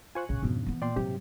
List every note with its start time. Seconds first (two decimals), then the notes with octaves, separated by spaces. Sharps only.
0.15 F4 C5 G#5 C#6 F#6
0.29 A#1 C#3
0.42 F2 G#2 B2 D4
0.66 E3 B3
0.82 A#2 D5 G5 C6
0.96 G#2 C3 F#3 G4